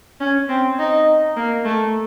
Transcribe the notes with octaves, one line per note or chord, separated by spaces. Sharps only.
C#4
C4
D#4
A#3
A3